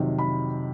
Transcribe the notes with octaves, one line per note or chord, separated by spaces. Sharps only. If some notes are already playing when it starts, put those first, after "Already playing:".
Already playing: F2 C3 D#3 F#3
B5